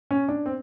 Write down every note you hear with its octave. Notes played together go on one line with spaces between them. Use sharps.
C#4
D4
C4